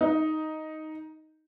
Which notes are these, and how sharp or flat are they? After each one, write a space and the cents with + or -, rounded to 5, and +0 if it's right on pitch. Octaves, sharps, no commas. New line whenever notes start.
D#4 +5